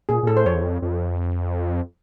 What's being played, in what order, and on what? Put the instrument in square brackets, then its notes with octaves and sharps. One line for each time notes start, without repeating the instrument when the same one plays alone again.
[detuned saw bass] A#2 [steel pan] G#4
[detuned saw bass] A#2
[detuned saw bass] A2 [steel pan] A4
[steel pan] C5
[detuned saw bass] F2 [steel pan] C#5
[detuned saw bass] E2
F2
F2